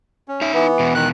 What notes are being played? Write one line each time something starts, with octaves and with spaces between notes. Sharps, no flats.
C#4
D#4 E5
E3 B3
E2 B2
D#3 F#6